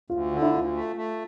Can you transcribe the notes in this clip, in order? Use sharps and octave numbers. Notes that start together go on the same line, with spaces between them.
D2 F4
D3
E4
D2 F4
A3
A3